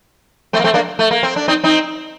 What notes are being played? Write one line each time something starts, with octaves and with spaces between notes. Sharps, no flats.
A3 C4
A#3
A3 C4
A#3 D4
A3
A#3
C4
D4
C4 D#4
C4 D#4